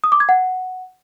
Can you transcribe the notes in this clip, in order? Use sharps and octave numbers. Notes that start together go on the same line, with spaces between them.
D#6
D6
G#6
F#5